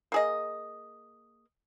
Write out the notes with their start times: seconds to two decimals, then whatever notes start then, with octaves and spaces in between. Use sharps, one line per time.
0.12 A#3 G#4 D#5